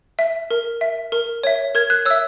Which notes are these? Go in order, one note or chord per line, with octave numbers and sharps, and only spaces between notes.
E5
A#4
E5
A#4
C#5 E5
A#4 G#6
F#6
C#5 E5 E6